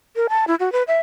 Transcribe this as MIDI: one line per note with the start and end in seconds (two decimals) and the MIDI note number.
0.16 0.27 70
0.29 0.45 81
0.48 0.55 64
0.60 0.72 66
0.72 0.83 71
0.88 1.00 76